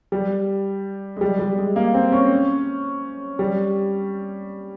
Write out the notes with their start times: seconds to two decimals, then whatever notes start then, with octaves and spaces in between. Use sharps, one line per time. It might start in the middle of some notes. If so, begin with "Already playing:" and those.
0.12 G3
1.17 G#3
1.21 G3
1.39 G3
1.58 G#3
1.76 A#3
1.94 C4
2.12 C#4
3.39 G3